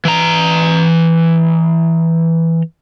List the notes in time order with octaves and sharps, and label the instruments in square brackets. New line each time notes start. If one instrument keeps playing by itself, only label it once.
[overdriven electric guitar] E3 A#5